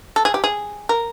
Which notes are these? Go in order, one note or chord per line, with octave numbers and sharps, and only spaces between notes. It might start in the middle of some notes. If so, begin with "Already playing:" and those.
A4
G#4
G4
G#4
A#4